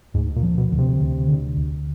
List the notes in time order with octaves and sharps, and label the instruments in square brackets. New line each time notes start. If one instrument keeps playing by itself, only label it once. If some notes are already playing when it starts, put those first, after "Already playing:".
[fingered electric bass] D2 [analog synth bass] G#2
[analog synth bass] A#2
[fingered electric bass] F3
[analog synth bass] B2
[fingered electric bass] D2
[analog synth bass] C3
[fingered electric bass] D2
D3
D2